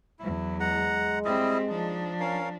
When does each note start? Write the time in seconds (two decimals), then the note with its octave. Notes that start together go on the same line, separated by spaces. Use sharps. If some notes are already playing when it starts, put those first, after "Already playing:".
0.19 E2 F#3 E4
0.60 G#3 F#5 A#5
1.25 G3 C4 E4 G4 D#5
1.69 F3 D4 D#4
2.20 C#4 A#4 F5